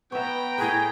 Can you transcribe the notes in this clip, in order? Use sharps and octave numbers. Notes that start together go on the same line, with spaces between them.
B3 C#5 E5 G5 A#5
A2 G#4 B4